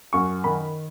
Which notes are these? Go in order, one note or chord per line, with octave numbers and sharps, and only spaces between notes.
F#2 C#6
D#3 B5